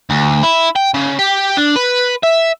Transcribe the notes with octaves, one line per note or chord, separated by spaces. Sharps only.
D2
E4
G5
C#3
G4
D4
B4
E5